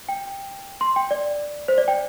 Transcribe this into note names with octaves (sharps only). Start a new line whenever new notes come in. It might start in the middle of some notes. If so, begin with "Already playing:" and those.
G5
C6
G5
D5
C5
D5
G5